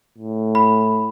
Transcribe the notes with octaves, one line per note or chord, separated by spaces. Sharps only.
A2
B5